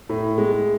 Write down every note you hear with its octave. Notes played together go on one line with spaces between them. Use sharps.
A2
G#3